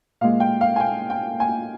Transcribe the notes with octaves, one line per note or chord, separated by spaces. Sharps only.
A#2 G#3 F5
G5
F5
G#5
G5
G5
G#5